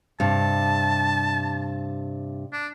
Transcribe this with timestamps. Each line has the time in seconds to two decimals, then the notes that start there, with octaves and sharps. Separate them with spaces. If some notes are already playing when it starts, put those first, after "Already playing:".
0.20 G2 C3 A5
2.52 D4